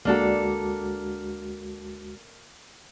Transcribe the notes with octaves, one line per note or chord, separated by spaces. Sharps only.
D2 G#3 A#3 D4 F#4 A4